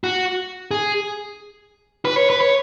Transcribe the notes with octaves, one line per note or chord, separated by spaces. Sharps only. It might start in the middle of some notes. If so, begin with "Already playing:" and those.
F#4
G#4
B4
C#5
B4
C#5